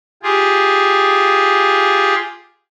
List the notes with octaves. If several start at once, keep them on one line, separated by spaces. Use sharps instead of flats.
F4 G4 G#4